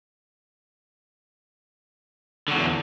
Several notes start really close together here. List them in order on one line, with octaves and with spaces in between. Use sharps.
D3 F#3 E2